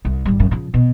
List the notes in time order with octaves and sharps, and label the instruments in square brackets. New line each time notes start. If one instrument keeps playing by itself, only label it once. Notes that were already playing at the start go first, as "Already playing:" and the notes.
[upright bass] C2
G#1 G3
F#2 C#3
C#3 F3
B2